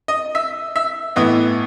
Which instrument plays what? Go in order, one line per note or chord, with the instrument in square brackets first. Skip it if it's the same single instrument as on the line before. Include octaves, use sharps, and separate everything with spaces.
[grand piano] D#5
E5
E5
A2 E3 B3 D#5